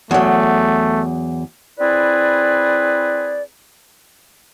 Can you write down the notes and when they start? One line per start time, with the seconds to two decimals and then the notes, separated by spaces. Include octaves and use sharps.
0.11 E2 F#3 A3
1.79 C4 E4 G#4 B4 D5